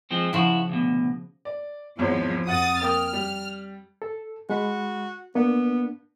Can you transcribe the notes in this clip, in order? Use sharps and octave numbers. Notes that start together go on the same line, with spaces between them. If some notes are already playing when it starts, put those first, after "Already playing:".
F3 G#3 C4
C#3 F3 E4 F#4
D2 B2
D5
G#1 E2 F3 C#5
F2 F#4 F#5 D#6 A6
A#3 G5 D#6 F6
G3
A4
G#3 F#4 B5
A#3 B3 D4